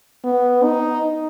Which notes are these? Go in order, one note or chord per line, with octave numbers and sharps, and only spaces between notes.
B3
D#4